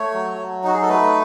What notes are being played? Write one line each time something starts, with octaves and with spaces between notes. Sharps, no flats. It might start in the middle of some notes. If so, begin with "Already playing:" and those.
Already playing: A3 C#5
F#3
F#3
D#4 F#4
G#4
A4
A3 B4